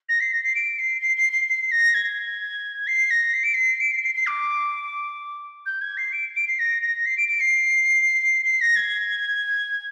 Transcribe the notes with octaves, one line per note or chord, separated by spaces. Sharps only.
A#6
C7
A#6
C7
D7
C7
C7
C7
C7
C7
A#6
G#6
C7
A#6
C7
D7
C7
D7
C7
C7
C7
D6
G6
G#6
C7
D7
D7
C7
A#6
A#6
C7
D7
D7
C7
C7
A#6
G#6